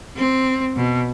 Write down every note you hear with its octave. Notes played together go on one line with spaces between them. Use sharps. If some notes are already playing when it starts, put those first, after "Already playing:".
C4
B2